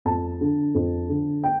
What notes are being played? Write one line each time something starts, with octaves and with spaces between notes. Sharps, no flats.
F2 A5
D3
F2
D3
G5